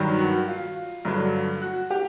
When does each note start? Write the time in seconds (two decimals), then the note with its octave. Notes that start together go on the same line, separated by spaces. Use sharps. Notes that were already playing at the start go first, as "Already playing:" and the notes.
Already playing: G2 D#3 F#3
0.19 F#4
0.48 F4
1.05 G2 D3 F#3
1.62 F#4
1.90 G4